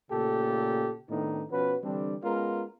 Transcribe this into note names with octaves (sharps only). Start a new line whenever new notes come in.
A#2 C#3 A3 G4 A4
A2 D#3 B3 C4 D4 D#4
B2 F3 C#4 F#4 B4
D3 E3 G3 C4 D4
G#3 B3 C#4 F4 A#4